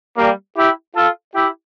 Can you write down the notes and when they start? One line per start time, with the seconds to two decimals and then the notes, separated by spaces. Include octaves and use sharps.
0.17 G3 A#3
0.57 E4 G4
0.95 F4 A4
1.35 E4 G4